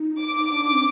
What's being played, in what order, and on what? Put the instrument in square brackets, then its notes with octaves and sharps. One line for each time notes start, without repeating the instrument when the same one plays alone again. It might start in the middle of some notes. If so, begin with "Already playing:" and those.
Already playing: [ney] D#4
[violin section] D6
[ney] D4
C4